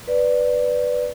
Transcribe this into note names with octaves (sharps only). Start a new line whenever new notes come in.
B4 D5